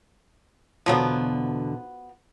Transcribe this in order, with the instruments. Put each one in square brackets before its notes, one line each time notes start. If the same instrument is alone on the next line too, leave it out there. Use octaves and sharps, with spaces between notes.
[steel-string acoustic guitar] E2 B2 D3 [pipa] F3 F#3 B3